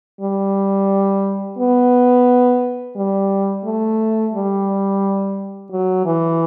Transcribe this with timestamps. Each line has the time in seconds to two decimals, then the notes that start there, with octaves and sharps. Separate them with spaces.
0.21 G3
1.59 B3
2.96 G3
3.65 A3
4.34 G3
5.71 F#3
6.05 E3